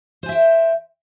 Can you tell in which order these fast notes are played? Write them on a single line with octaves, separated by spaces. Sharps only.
C5 G#5 E5 G5